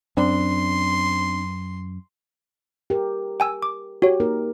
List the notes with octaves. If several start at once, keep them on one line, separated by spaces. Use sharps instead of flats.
F#2 C4 D4 C6
G4 A#4
G5 G#5 E6
D6
F#4 G4 C#5
A#3 D#4 A#4